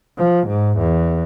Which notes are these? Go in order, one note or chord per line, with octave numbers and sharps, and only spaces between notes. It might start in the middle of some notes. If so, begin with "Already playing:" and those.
F3
G#2
E2